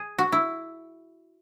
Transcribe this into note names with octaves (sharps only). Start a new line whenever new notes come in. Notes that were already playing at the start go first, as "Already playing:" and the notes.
Already playing: G#4
F#4
E4